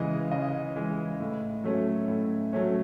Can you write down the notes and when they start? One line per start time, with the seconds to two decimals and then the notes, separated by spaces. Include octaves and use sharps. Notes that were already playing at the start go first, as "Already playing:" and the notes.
Already playing: C#3 E3 G#3 D#5
0.32 C#3 D#5
0.76 E3 G#3
1.20 A2
1.64 F#3 A3 C#4
2.08 A2
2.53 F#3 A3 C#4